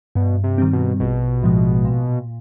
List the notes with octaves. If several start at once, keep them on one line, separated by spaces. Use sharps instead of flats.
G2 B2
C3
D#3 G3 C4
B2
A#1 B2
A2 F3 G#3
A#2